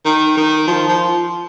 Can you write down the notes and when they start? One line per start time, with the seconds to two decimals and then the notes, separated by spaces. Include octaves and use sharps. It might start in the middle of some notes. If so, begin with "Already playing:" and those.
0.05 D#3
0.37 D#3
0.67 F3
0.88 F3